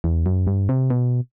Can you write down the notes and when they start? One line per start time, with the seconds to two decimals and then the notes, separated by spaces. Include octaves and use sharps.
0.04 E2
0.26 F#2
0.47 G2
0.69 C3
0.90 B2